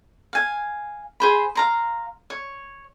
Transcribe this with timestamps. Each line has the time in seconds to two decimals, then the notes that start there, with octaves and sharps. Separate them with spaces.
0.33 F5 G#5
1.20 G#4 C5 B5
1.55 F5 A#5 C6
2.30 C#5